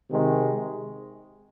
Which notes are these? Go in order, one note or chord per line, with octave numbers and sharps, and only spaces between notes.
C3 D#3 G#3